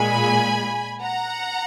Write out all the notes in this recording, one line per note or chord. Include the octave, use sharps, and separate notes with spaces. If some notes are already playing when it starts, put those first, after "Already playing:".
Already playing: A#2 G#3 G#5 B5
F#5 A#5